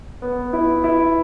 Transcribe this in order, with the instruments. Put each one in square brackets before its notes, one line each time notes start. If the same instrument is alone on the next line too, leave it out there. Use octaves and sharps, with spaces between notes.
[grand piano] B3
E4
E4